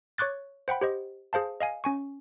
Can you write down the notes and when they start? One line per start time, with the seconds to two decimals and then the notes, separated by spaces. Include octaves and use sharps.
0.18 C#5 C#6 D6 F#6 A6
0.68 C5 F#5 G5 B5
0.81 G4 C5 D#5
1.33 G#4 C5 F5 A5
1.60 D#5 F5 G#5
1.84 C#4 G#5 C#6